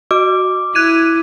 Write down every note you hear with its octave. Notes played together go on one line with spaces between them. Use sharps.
F#4 D6
E4 F#6 G#6 D#7